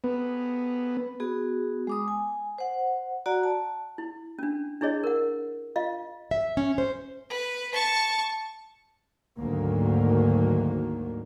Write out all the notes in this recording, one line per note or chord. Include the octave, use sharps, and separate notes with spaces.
B3
B3 F#4 G#4
G#3 D6 D#6
G#5
C5 F#5
F#4 D5 F#5 A#5
A5
E4
C#4 D4
D4 E4 G#4 C#5 D#5
A#4 F#5
F4 D#5 F5
E5
C#4
C5
B4
A5 C#6
D2 G#2 D#3 F#3 A#3